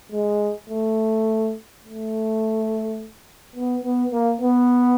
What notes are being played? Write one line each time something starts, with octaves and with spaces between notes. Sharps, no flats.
G#3
A3
A3
B3
B3
A#3
B3